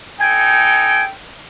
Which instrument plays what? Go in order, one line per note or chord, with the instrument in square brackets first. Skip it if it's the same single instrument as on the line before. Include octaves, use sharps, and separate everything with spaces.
[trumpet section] D#4 A4 G5 [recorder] G#5